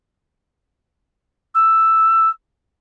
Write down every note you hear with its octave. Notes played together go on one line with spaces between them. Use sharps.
E6